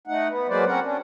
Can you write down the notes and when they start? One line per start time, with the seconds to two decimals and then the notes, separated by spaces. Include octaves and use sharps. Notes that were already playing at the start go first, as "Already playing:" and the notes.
0.07 A3 D#4 F#5
0.28 B3
0.49 F#3 G#3 A#3 B4 C5 D5
0.66 C4 C#4 F#4 A#4 F#5
0.83 C#4 D4